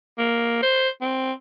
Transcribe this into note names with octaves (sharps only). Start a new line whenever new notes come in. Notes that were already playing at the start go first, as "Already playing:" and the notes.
A#3
C5
C4